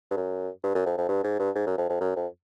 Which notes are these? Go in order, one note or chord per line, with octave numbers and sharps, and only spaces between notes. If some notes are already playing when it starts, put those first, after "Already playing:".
G2
F#2
G2
F#2
F2
F2
G2
G#2
G2
G#2
F#2
F2
F2
F#2
F2